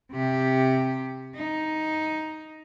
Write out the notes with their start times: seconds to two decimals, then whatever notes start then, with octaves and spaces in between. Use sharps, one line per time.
0.12 C3 G4
1.35 D#4